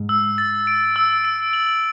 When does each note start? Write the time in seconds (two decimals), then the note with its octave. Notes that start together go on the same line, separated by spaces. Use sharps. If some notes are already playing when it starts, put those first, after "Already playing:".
Already playing: G#2
0.09 E6
0.38 A6
0.67 D7
0.96 E6
1.25 D7
1.53 F#7